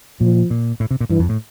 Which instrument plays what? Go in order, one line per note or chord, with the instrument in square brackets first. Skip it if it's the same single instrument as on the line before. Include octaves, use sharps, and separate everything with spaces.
[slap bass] A#2 [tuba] F3
[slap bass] A#2
A2
C3
A#2
[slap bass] G2 [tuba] E3
[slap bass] F2
A2